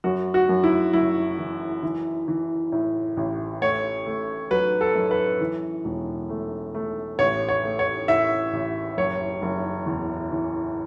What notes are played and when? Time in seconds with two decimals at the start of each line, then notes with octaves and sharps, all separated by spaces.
0.04 F#2 F#4
0.34 F#4
0.49 F#2
0.64 E4
0.93 F#1 E4
1.38 E3
1.83 E3
2.28 E3
2.72 A2
3.17 A1
3.61 A3 C#5
4.06 A3
4.51 F#3 B4
4.81 A4
4.96 F#2
5.11 B4
5.40 E3
5.85 E1
6.29 A3
6.75 A3
7.19 A1 C#5
7.49 C#5
7.64 A3
7.79 C#5
8.08 A2 E5
8.53 A1
8.97 F#1 C#5
9.42 F#1
9.86 E2
10.31 E3